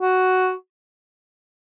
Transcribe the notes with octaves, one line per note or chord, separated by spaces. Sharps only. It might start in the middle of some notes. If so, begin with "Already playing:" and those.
F#4